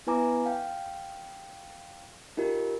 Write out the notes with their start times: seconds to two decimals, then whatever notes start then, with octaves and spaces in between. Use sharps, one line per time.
0.07 B3 E4 B4 G#5 A#5 D6
0.46 F5 G5
2.37 D#4 F4 G4 A#4